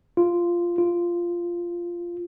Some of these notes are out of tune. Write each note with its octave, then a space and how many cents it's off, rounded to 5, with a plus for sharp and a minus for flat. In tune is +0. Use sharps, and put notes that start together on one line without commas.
F4 -10
F4 -10